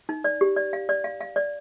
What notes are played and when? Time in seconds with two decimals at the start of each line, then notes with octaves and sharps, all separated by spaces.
0.09 D#4
0.24 D5
0.41 G4
0.56 D5
0.73 F5
0.89 D5
1.04 F5
1.21 F5
1.36 D5